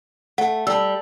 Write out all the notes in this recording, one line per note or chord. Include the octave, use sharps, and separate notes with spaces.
A3 F#5
G3 A5 E6